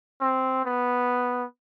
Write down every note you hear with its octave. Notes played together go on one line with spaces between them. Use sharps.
C4
B3